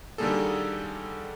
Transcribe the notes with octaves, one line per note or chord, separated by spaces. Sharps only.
D3 D#3 G3 A#3 G#4 A4